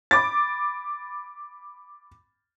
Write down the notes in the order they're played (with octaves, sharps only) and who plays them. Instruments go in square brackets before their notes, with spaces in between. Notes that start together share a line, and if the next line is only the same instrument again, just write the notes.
[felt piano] B5 D6 A6